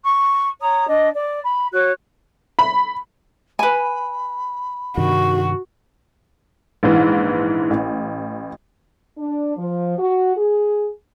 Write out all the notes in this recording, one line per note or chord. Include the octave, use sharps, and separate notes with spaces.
C#6
C#5 A#5 D#6
D4 D#5
D5
B5
F#4 C#5 F#6
B5
B4 G#5 B5
G2 C3 D#3 F#4
A#1 G#2 E3
A1
D4
F3
F#4
G#4